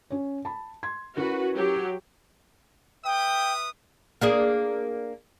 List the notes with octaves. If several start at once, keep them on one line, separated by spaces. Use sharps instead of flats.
C#4 C#5
A5 B5
C6 G#6
C#4 E4 F#4 A#4 B4
F#3 G4
B4 E5 G5 D#6
A#3 D4 G#4